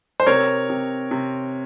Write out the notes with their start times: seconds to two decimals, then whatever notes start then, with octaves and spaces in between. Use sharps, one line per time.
0.20 C5
0.27 C3 A#4 C#5
0.70 C3
1.11 C3